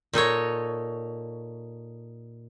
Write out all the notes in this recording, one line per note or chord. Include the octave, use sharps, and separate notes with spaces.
A#2 D#4 A4 C#5